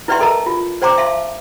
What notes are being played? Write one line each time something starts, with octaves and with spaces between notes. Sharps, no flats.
E4 B4 D5 E5 G5 C6
A4 A#4 D#5 A5 A#5
F4
C5 D5 G5 A#5 C6 D6
E5 F5 A5 C6